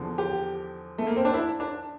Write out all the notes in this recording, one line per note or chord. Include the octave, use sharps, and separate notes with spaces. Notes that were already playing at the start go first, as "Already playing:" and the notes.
Already playing: E2 D3 F3
G4
A3
A#3
C4
D4
E4
D4